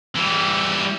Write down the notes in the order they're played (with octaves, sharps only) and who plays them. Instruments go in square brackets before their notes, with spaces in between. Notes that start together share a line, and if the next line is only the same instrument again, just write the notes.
[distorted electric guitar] E3 G3